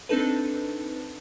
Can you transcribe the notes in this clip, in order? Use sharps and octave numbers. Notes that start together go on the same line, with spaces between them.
C4 D4 D#4 A4 B4